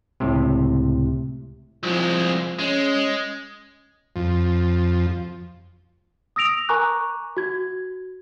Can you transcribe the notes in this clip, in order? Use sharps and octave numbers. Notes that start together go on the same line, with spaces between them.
C#2 A2 C3
C2 F3 G#3
G#3 C#4
F2
D#6 E6 A#6 D7 F7
A#4 G#5 A#5 C#6 D6 F#6
F#4 G#6